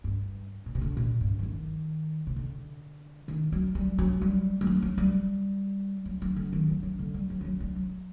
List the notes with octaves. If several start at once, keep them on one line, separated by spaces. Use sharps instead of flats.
G2
A#2
C3
D3
A#2
G2
F#3
D#3
C3
D3
D#3
F#3
G3
F#3
G3
G3
F#3
F#3
G3
F#3
F#3
D3
D#3
F#3
F#3
D3
G3
F#3
D#3
F#3
G3
F#3